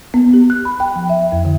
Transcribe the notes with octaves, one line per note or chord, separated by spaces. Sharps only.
B3
G4
F#6
B5
G5
F3
E5
F2
D3